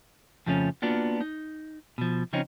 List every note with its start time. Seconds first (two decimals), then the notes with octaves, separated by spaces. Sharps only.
0.46 F2 C#3 F3 A3 C4 C#4
0.82 A#3 B3 D4 F4 F#4
1.21 D#4
1.98 B2 F3
2.33 C#3 F3 C4 C#4 D#4